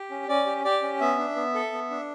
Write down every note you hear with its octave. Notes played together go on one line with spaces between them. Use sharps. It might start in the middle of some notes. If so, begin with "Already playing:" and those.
Already playing: G4
C#4
C#4 D5
G4
G4 D5
C#4
B3 E5
D4
B3
A4
B3
D4